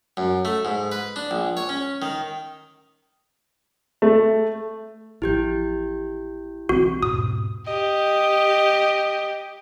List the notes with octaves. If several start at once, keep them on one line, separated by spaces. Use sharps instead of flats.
F#2
A3
G#2
B4
D4
A#1
C#5
C#4
D#3
A3
A1 F3 E4 G4 G6
B1 E3 C4 F#4
E2 G#2 B2 D#6
G4 D#5